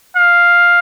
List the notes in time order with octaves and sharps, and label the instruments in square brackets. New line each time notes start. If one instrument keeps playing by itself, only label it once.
[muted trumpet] F5